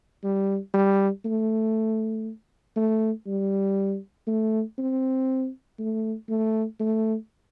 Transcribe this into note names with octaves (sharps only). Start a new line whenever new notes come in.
G3
G3
A3
A3
G3
A3
C4
A3
A3
A3